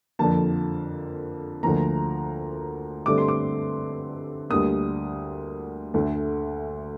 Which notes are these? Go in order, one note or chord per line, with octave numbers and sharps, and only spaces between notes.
F2 D3 F3 A#3 A5
D2 D3 F3 A#3 A#5
G2 D3 A3 C4 D6
C6
D6
D2 D3 G3 A#3 D#6
D2 D3 A3